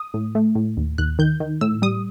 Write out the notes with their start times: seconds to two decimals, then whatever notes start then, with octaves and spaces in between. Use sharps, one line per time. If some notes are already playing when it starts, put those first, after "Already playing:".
Already playing: D#6
0.14 A2
0.35 A3
0.55 A2
0.77 D#2
0.98 D#2 F#6
1.19 D#3 G6
1.40 D#3
1.61 A2 E6
1.82 G3 D#6